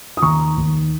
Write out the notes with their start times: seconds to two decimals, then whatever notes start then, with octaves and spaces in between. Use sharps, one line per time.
0.17 D#6
0.22 D#2 A#5 C#6
0.58 D#2